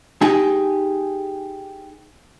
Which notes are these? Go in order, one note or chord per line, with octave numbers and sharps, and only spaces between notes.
D#4 G4 G#4